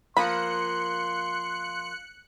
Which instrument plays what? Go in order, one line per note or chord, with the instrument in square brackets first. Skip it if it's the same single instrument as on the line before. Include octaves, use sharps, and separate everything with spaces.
[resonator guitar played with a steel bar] F3 A#3 F4 [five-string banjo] B5 [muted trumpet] C6 [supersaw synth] F#6 C#7